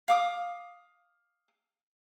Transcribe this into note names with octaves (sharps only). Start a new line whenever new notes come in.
F5 D6 D#6